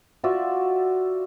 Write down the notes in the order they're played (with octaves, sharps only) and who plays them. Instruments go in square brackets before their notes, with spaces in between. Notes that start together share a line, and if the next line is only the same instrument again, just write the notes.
[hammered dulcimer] F4 F#4 D5 E5